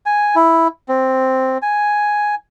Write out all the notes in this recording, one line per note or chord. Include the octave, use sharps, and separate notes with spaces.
G#5
E4
C4
G#5